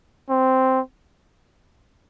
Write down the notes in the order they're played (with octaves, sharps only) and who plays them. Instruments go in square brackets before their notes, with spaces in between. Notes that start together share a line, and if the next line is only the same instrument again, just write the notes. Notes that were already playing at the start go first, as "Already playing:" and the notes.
[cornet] C4